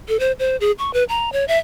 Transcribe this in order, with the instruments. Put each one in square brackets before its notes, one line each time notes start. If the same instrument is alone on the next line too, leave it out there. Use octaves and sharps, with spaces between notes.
[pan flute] A4
C5
C5
G#4
C#6
B4
A#5
C#5
E5